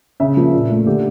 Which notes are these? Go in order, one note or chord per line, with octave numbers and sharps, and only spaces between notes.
C#3 E5
F3 A#3
A#2
A3
D3 G4